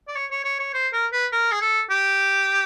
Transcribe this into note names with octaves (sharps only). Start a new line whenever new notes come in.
D5
C#5
C#5
C#5
C#5
C5
A#4
B4
A#4
G#4
A4
G4